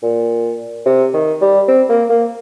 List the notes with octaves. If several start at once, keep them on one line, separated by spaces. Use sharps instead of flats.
A#2
C3
D#3
G3
C4
A#3
A#3